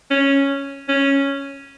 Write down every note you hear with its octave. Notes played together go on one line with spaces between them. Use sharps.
C#4
C#4